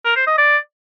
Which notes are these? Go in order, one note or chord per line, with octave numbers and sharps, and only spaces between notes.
A#4
C5
D#5
D5